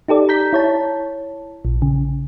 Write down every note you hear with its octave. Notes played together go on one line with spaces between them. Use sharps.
D#4 G4 A4 D5
A#5 G6 B6
E4 C#5 A5
A#1
C#3